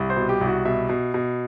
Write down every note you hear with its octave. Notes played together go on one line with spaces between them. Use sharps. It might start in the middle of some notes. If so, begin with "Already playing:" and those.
Already playing: C2
C5
B2
G4
C2
F#4
B2 E5
B2
B2